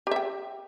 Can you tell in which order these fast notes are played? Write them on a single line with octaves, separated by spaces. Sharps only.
G4 E5 G5